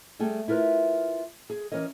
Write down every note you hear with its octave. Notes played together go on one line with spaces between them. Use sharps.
G3 A3 G#4 G5
E4 F4 A#4 B4
G#4
E3 C#4 A#4 C#5 D#5